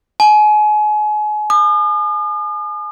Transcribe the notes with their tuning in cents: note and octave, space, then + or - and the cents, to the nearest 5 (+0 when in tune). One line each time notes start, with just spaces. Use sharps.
G#5 +30
D#6 -45